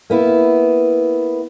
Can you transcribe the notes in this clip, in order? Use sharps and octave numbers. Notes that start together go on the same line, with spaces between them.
A#3 B3 E4